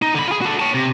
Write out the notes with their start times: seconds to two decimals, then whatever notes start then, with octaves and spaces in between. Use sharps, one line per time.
0.02 D#4
0.15 D3 B5
0.28 F4 G#4
0.41 F#4 A4
0.60 C#5 A5
0.74 C3